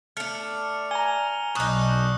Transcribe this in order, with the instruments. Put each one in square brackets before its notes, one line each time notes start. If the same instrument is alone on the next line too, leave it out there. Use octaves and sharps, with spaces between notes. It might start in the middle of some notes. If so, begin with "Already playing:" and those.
[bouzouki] A3 D4 [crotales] F6 C#7 F7
[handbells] G#5 A#5 [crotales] G7
[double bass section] B1 [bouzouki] D4 D#4 [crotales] C#6 D#6 F#6